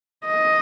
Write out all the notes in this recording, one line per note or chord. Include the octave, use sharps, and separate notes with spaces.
D#5